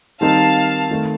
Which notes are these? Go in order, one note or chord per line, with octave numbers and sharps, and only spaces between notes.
D#3 G3 C4 D#4 A#4 F5 A5
D#3 A3 C4